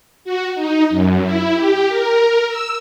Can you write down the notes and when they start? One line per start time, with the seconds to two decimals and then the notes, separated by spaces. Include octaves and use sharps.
0.25 F#4
0.55 D#4
0.90 F#2
1.22 E4
1.55 G4
1.89 A#4
2.48 E6